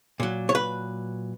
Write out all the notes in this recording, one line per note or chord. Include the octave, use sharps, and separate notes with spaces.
A#2 F#3
C#5
B4